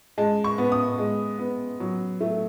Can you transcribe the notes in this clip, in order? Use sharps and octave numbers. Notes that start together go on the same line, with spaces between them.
G#3 A5
C#6
B3
D#6
G#3
B3
F#3
A3